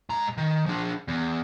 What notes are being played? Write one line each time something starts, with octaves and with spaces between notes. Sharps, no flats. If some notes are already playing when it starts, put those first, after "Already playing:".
G#2 A#5
D#3
F3 D4
E2